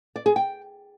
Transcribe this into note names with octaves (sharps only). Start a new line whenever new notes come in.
D5
G#4
G5